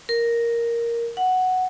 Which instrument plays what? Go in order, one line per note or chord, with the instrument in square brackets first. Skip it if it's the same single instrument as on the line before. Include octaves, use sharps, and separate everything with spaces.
[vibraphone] A#4
F#5